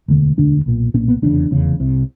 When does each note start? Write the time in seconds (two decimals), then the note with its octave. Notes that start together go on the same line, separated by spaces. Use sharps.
0.08 E1 D2 D3
0.37 E1 D2 D3 D4
0.66 B1 A#2
0.94 B1 A#2 C#4
1.08 B3
1.22 F1 E2 C#3 D4
1.51 F1 E2 C#3
1.80 C2 C3